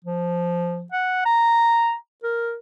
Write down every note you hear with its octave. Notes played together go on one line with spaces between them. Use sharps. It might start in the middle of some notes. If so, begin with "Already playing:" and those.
F3
F#5
A#5
A#4